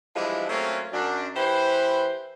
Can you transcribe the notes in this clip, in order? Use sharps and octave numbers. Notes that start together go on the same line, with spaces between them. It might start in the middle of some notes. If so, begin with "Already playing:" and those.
E3 F3 G3 G#3 D4 E4
F#3 A3 A#3 C4 C#4 F4
F#2 D4
E3 G4 B4 C5